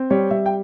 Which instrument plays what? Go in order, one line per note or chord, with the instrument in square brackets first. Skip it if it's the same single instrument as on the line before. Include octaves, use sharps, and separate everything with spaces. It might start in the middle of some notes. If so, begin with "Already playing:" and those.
Already playing: [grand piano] C4
G3 C#5
G3 E5
G5